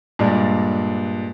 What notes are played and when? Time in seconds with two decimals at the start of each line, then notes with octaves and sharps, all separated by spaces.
0.19 G2 A#2 G#3 D4